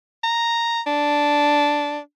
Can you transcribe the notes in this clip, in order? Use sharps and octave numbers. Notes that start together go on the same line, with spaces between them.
A#5
D4